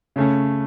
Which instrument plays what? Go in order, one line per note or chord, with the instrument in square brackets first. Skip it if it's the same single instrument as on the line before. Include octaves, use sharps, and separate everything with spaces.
[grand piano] C#3 A3 C#4